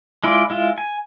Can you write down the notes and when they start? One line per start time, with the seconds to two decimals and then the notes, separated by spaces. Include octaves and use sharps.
0.24 G#3 E4 F4 D5
0.50 G#3 E4 F4
0.78 G#5